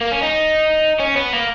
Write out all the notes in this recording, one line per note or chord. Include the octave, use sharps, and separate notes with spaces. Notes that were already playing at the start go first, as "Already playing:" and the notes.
A#3
C#4
D#4
C#4
B3
A#3